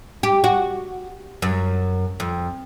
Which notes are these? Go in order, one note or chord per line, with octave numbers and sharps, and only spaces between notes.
G4
F#4
F#2
F2